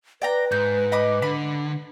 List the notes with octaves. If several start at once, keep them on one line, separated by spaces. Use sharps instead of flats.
B4 D5 G5 A#5
G#2 G6
D#5 B5 D6
D3 B5